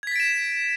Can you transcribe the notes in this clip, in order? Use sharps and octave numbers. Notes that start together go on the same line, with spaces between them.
G#6 A6 B6 D7 E7